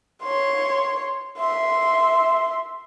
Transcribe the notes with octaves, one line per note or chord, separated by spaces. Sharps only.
C#5 C6
E5 C6